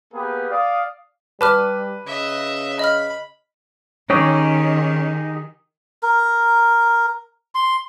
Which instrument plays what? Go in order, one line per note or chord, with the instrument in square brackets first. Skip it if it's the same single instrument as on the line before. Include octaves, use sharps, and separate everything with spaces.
[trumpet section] A#3 B3 G4 G#4 A#4 B4
D5 F5 D#6
[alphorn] G3 [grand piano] B4 [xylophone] A5 D6 F6
[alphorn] C#3 [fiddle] D#5 E5
[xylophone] D#5 F6 [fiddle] B5
[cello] D#3 [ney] C#4 [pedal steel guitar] D#4 G4 G#4 [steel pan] C#5
[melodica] A#4
C6